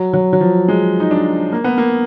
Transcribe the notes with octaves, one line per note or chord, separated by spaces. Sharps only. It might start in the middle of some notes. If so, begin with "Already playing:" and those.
Already playing: F#3
F#3
F#3
F3
G#3
D#4
D4
A#3
B3
A#3